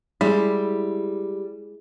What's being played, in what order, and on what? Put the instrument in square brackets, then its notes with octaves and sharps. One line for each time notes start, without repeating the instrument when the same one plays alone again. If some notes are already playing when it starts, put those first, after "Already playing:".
[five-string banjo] G3 [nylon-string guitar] G#3 E4